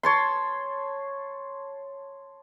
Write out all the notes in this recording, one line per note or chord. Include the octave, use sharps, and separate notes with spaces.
C#5 A5 C6